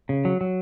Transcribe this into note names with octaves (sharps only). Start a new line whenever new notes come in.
C#3
F#3
F#3